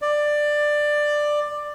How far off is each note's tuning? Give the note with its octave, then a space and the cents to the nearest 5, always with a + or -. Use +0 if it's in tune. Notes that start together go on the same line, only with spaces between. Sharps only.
D5 +15